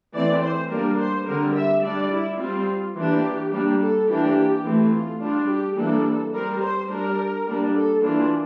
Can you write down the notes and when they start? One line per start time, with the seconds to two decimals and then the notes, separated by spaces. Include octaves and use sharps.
0.14 E3 A3 C4 D5
0.43 C5
0.70 G3 A#3 D4 A#4
0.98 C5
1.26 D3 G3 C4 A#4
1.55 E5
1.83 G3 D4 D5
2.11 E4
2.39 G3 C4 F4
2.95 E3 A#3 D4 G4
3.52 G3 A#3 D4
3.80 A4
4.08 E3 A#3 D4 G4
4.64 E3 A3 C4
4.93 F4
5.21 G3 D4 F4
5.49 G4
5.77 E3 G3 A#3 D4 A4
6.33 G3 C4 A#4
6.61 C5
6.90 G3 D4 A#4
7.46 G3 A#3 D4
7.75 A4
8.03 E3 A#3 D4 F4